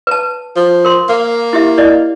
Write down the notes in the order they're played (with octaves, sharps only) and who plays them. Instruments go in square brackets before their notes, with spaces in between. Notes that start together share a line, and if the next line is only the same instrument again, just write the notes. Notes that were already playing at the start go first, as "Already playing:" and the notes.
[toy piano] B4 A5
[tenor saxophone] F3
[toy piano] A#4 C6
[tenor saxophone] A#3
[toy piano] E4 G4 E5
E4 D5 D#5